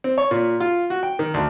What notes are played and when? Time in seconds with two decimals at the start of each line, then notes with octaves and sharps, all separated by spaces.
0.04 C4
0.18 C#5
0.31 A#2
0.60 F4
0.90 F#4
1.03 G5
1.19 D#3
1.34 D2